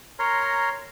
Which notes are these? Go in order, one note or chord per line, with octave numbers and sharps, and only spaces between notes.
A#4 C#5 A#5 C6